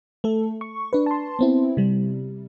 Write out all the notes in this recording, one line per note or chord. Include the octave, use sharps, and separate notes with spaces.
A3 A4
C#6
D4 B4
A5 C6
B3 C4 E4
C3 G3